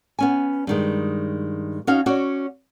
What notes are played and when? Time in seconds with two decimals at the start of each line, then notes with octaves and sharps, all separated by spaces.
0.19 B3 C#4 G#5
0.67 G2 D#3 G#3
1.87 C#4 D#4 F#4 F5
2.06 C#4 F#4 C#5 D5